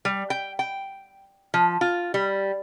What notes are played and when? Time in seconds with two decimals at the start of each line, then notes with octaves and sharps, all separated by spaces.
0.05 G3
0.30 G5
0.59 G5
1.54 F3
1.81 F4
2.14 G3